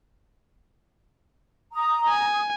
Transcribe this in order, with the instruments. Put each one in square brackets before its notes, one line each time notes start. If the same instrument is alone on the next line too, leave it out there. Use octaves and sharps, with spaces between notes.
[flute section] A#5 [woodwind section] D#6
[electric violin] G#5